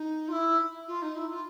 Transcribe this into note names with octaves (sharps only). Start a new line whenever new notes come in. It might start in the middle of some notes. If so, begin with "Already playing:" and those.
Already playing: D#4
F4
E4
F4
D#4
E4
F4